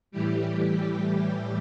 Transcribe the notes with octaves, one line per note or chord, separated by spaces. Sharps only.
A2 E3 G3 G4